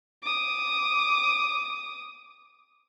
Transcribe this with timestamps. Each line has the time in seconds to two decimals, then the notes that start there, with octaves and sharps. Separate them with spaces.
0.22 D6 D#6